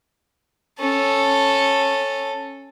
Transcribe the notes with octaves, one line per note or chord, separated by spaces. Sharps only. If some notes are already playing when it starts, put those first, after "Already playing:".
C#4 A4